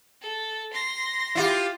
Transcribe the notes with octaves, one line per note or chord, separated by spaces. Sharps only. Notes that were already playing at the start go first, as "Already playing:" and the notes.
A4
C6 A#6
E4 F4 G4